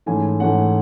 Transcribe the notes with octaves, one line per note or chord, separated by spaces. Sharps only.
G#2 E3 A3 C#4 G#5
G#2 E3 A3 C#4 F#5